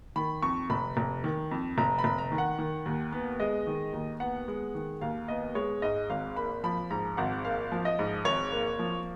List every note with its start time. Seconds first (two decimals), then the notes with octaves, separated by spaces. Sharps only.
0.16 D#3 B5
0.42 F2 C#6
0.70 F1 B5
0.97 F1
1.24 D#3
1.51 F2
1.78 F1 A#5
1.98 B5
2.04 F1
2.18 A#5
2.32 D#3
2.38 F#5
2.59 D#3
2.86 D#2
3.12 B3
3.40 G#3 D#5
3.67 D#3
3.93 D#2
4.20 B3 F#5
4.48 G#3
4.75 D#3
5.01 D#2 F5
5.28 B3 D#5
5.55 G#3 C#5
5.82 G#2 D#5
6.10 G#1 F5
6.36 A#3 B5
6.64 F3 B5
6.90 G#2 A#5
7.17 G#1 F#5
7.44 A#3 F5
7.72 F3
7.85 D#5
7.99 G#2
8.25 G#1 C#5
8.52 A#3
8.79 F3